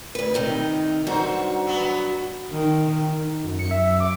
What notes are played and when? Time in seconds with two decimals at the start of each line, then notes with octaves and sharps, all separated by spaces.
0.15 D2 B4
0.34 C3 D#3 D#4
1.07 G2 F#3 F#4 C5
1.67 F#3 B3
2.52 D#3
3.44 F#2
3.59 C#7
3.71 E5
4.00 D6